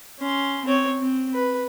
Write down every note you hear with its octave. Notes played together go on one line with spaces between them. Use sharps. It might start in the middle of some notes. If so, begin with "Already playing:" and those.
C#4 C6
C4 C#5
C4
B4